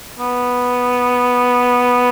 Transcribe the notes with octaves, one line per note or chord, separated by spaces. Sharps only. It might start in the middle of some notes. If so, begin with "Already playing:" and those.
B3